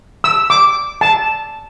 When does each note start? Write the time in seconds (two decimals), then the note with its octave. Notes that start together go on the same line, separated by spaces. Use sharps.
0.24 E6
0.50 D6
1.01 A5